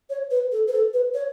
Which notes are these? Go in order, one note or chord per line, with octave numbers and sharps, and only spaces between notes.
C#5
B4
A4
B4
A4
B4
C#5